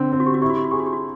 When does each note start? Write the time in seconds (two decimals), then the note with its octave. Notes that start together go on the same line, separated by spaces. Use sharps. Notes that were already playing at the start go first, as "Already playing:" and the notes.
Already playing: D3 C4
0.12 C4
0.20 F#4
0.26 G4
0.34 F#4
0.41 E4 G4
0.50 F#4
0.57 G4
0.64 F#4
0.71 G4 G#4
0.79 F#4
0.86 G4
0.93 F#4